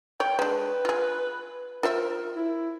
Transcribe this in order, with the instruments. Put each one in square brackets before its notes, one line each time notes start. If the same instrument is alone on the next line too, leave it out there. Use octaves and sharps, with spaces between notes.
[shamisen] C#5 [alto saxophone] G5
[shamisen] G#3 D4 [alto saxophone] B4
[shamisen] F4 G#4
[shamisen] F4 C5 E5 [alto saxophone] A#4
[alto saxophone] E4